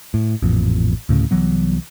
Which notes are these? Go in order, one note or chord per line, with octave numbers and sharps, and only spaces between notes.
A2
A1 F2 A#2
D2 A2 C#3
C2 E3 F#3 B3